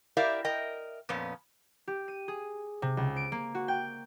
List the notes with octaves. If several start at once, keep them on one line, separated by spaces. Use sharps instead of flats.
E4 G4 A#4 D5 E5 F5
A#4 D#5 G5
F2 A#2 B3 C#4
G4
D#7
G#4
C3
C#2
D7
A#3
F#4
G5